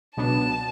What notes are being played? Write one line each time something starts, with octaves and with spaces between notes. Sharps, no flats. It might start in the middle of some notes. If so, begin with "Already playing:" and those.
C#2 B2 F#3 B3 D4 A5